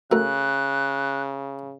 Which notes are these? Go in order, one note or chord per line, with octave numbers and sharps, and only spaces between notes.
C#3 A3 F#4 A4 A#4 F#6